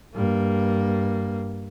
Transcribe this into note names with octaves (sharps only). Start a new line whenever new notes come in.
G2 A#3